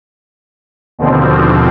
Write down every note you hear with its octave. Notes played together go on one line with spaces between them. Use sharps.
D#2 B2 D3 F3 C4